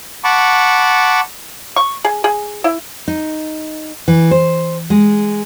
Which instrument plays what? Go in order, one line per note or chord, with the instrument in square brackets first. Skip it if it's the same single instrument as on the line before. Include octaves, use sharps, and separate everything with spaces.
[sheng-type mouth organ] F#5 A5 B5 C#6 D6
[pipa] C#6
G#4
G#4
E4
[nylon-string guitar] D#4
E3
C5
G#3